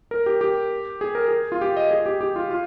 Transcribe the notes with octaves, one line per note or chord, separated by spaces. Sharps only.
A#4
G4
G4
G#4
A#4
G#4
F4
G4
D#5
G#4
G4
G4
F4
F4